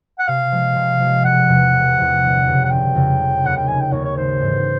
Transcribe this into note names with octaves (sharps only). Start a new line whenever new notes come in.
F#5
C3 F5
F3 G#3
C3
F3 G#3
E1 F#5
E2 C3 F3
E1
E2 C3 F3
G1
F2 C#3
F#5
G1 G5
F2 C#3
F1
D#2 C#3 F#5
G5
F1 G#5
G5
D#2 C#3 C#5
C#5
G#1 C5
G#2 E3